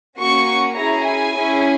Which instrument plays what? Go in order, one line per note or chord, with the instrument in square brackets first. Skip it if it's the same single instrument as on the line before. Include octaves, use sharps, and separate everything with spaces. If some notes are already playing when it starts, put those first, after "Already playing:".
[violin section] A#3 C#4 F#4 C#6
C#4 E4 G#4 A#5
G#5
C#4 E4 G#4